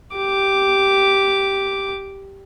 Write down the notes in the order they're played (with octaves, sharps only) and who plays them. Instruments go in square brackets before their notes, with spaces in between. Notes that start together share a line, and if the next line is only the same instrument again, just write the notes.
[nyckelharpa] G4 D6